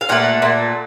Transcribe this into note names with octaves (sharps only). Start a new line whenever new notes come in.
F5
A#2 A3 F#5
A#2 A3